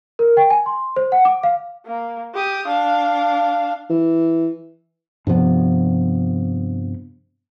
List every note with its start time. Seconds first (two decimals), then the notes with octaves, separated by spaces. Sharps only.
0.19 A#4
0.37 G5
0.50 G#5
0.66 C6
0.96 C5
1.12 F#5
1.25 D6
1.43 F5
1.86 A#3
2.35 G4 D#6
2.67 D4 F5
3.90 E3
5.27 G2 C3 F3 B3